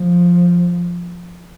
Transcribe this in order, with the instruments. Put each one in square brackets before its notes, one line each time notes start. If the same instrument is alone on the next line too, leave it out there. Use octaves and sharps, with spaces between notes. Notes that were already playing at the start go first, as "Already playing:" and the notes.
Already playing: [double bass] F3